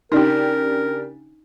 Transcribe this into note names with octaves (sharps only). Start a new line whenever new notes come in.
C#3 D4 D#4 G4 A#4